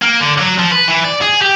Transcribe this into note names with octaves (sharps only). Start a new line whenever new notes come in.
A#3
D3
F#3
F3
B4
E3
D5
G#4
G4